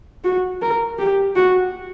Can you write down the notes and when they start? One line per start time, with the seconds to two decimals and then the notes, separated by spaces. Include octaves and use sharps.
0.24 F#4
0.62 A#4
0.99 G4
1.36 F#4